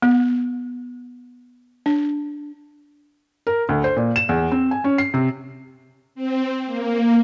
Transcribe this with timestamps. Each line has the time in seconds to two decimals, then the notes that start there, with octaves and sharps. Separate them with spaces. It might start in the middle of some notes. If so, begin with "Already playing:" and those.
0.02 B3
1.86 D4
3.47 A#4
3.69 D2
3.84 C5
3.96 A#2
4.16 E7
4.29 E2
4.52 C4
4.71 G#5
4.84 C#4
4.98 C7
5.14 C3
6.15 C4
6.66 A#3